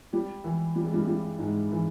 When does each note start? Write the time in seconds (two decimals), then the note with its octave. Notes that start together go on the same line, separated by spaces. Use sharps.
0.13 G3 G4
0.44 E3 E4
0.76 G3
0.85 G#3
0.93 G2 G3
1.07 G2 G3
1.39 G#2 G#3
1.72 E3